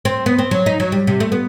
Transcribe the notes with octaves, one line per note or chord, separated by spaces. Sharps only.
C4
B3
C4
F#3
D#4
F#3
G3
C3
A3
B3